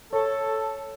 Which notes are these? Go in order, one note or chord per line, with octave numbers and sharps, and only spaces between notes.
A4 C#5